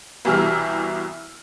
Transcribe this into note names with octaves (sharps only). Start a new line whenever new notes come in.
C2 B2 E3 G4 E6 F6